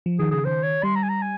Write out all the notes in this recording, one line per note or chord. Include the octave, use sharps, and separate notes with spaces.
F3
D#3 G#4
C#3 G#4
D#3 C5
C#5
G3 C6
A#5
G#5
A#5
G#5